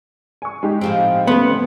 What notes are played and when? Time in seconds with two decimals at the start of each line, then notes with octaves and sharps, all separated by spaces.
0.42 G#5 C#6
0.63 G#3 D#4 G4
0.81 A2 F3 C4
1.27 A1 D2 A2 A3 B3 C6